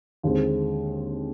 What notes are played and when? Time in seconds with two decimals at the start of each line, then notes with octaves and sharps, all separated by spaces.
0.23 D#2 D3 G#3 C4